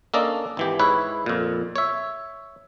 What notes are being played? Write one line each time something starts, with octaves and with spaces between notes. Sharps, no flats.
A#3 C#4 D4 A4 D5 D#5
G#1 E3 G4
G#2 E4 B4 C#5
F2 A#2
C#5 E5